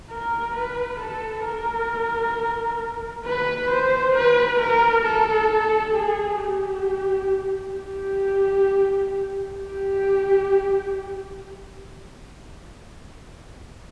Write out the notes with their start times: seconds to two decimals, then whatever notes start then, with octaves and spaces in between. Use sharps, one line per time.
0.10 A#4
0.55 B4
1.00 A4
1.45 A#4
3.25 B4
3.71 C5
4.15 B4
4.60 A#4
5.06 A4
5.95 G#4
6.40 G4
7.76 G4
9.55 G4